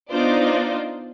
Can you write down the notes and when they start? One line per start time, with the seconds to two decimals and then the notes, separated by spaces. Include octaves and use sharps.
0.10 B3 D4 D#4 F4 C5 D5